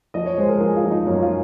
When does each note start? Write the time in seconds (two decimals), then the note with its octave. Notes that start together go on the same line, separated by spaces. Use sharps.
0.14 F3 D#5
0.26 C#5
0.38 G#3 C5
0.49 A#4
0.60 F3 G#4
0.76 F4
0.84 F3
0.91 D#4
1.07 F#2 C#4
1.22 F4